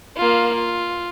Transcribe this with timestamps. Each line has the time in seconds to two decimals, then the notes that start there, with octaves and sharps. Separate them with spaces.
0.17 A#3 F4
0.54 F4